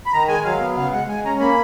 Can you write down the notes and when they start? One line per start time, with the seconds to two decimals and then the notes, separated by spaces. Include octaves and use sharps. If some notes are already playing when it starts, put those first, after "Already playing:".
0.06 B5
0.12 D#3 A#5
0.28 G#3 G#5
0.44 F#3 F5
0.60 B3
0.76 C#3 F5
0.92 G#3 F#5
1.08 G#3 G#5
1.25 C#4 A#5
1.40 A#3 B5